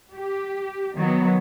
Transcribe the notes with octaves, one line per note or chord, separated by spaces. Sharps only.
G4
D#3 F#3 B3